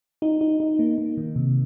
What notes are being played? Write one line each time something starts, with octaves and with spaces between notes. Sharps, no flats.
D#4
D#4
D#4
A#3
A#3
D#3
C3